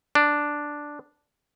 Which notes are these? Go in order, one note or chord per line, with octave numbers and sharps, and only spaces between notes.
D4